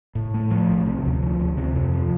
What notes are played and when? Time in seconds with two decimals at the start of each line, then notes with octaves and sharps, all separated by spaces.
0.15 A2
0.34 A3
0.51 F3
0.68 B1
0.86 C3
1.05 D2
1.22 F3
1.40 D2
1.57 C3
1.75 F2
1.94 F3